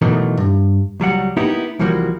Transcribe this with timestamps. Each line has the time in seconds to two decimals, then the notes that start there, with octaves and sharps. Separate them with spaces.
0.02 B2 D#3 E3 F#3 A3
0.37 G2
1.00 C#2 F#3 G3 F#5
1.37 A#3 B3 D#4 E4 G4
1.79 C2 E3 F3 G3 A#3 F#4